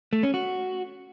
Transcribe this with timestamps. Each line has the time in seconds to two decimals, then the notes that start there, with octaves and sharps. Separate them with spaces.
0.13 A3
0.23 C#4
0.34 F#4